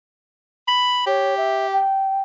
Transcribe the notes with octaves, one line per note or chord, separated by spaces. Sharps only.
B5
G4 C#5
E5
G5